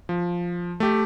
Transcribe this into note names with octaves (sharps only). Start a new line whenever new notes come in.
F3
A3 G4